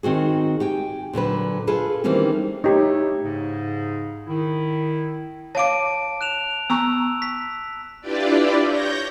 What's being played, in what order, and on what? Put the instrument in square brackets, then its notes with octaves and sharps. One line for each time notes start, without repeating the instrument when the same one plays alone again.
[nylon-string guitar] D#3 C4 F#4 G#4
G4 G5 G#5
A#2 D3 F#3 B4
F4 G#4 A4 B4
D#3 E3 G3 A#3 C4 C#4
[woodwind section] A3 E4 C#5 [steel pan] D#4 G4
[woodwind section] G#2 C#3
D#3 E4
[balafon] C#5 F5 D6 [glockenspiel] A5 D7
[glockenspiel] F#6 E7 F7
[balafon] B3 A#5 C#6 [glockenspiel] E6
[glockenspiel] B6
[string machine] D4 E4 F4 G4 B4 D5
C#5 G6 A#6